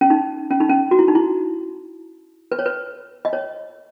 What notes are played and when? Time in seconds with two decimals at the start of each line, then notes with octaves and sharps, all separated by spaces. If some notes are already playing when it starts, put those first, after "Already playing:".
0.01 C#4
0.10 D#4
0.50 C#4
0.60 D#4
0.69 C#4
0.91 F#4
0.99 E4
1.08 D#4
1.15 E4
2.52 B4
2.59 C#5
2.66 B4
3.25 D#5
3.33 C#5